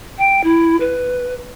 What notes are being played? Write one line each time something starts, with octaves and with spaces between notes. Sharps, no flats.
G5
E4
B4